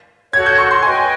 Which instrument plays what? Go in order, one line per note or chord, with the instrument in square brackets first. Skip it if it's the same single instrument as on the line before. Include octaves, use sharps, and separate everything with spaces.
[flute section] F#4 A4 C#5 F#5 [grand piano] G#6
[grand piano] G6
C#6
C6
[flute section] B4 D#5 G5 [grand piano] G#5